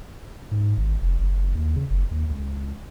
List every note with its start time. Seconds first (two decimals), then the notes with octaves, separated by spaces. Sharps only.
0.51 G#2
0.77 G#1
1.01 F1
1.18 F#1
1.55 D#2
1.76 C#3
1.90 F#1
2.11 D#2
2.30 C#2